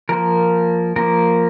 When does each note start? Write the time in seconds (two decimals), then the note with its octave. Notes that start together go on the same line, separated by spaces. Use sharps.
0.09 F3 A#3 A#4
0.96 F3 A#3 A#4